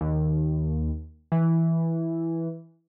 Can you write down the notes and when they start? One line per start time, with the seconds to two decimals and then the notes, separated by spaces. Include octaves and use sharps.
0.01 D#2
1.32 E3